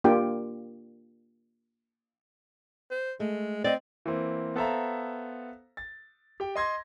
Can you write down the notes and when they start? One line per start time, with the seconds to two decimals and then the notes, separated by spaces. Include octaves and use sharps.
0.04 A#3 D4 F4 G4 G5
2.91 C5
3.20 G#3 A3
3.64 C4 D5 D#5
4.06 E3 A#3 C4
4.56 B3 A4 C5 E5 F5 A#5
5.77 A6
6.40 G4 G5
6.56 D#5 C6 G#6 A#6